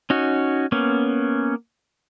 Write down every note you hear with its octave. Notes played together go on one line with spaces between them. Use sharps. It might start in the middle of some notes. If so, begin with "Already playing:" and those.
C#4 D#4 F#4
A#3 B3 C#4